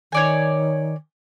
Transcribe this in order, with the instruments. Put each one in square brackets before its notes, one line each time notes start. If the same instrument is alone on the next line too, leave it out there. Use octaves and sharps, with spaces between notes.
[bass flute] D#3 [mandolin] C#5 D5 G#5